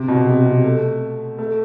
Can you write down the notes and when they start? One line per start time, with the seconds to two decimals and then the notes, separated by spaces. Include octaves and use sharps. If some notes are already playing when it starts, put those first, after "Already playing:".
Already playing: C3
0.08 B2
0.26 C3
0.46 C3
0.65 A3
1.39 A3